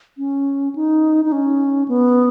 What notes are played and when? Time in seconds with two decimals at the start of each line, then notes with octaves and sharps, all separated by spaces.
0.18 C#4
0.76 D#4
1.25 D#4
1.32 C#4
1.88 B3